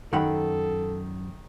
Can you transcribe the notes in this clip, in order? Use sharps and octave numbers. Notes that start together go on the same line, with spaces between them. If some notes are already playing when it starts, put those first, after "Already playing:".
F#2 D#3 A4 F#5 B5